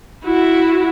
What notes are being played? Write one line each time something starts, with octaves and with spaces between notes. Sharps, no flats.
E4 F#4